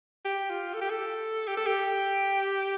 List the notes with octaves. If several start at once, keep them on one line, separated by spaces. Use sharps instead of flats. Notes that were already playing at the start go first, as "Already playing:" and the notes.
G4
F4
A4
G4
A4
G4
A4
G4